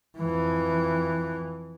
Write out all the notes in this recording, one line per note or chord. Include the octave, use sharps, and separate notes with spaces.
F2 E3